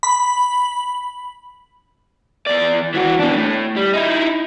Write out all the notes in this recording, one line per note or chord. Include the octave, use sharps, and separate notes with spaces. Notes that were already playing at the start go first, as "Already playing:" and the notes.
B5
E2 D5
E3 F#4
B2 D4
A2
G3
D#4 E4